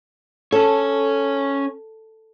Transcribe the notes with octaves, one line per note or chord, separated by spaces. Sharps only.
C#4 A4 C#5